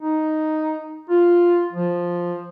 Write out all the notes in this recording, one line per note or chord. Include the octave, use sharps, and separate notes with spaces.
D#4
F4
F3